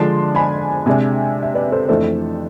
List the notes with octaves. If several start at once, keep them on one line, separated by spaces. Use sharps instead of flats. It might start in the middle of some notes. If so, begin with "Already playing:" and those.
Already playing: D3 F3 G#3 D4 A5 C6
G#5 B5
C3 G#3 D4 E5 G#5
E5
B4 D5
A4 C5
F2 E3 A3 D4 A4 C5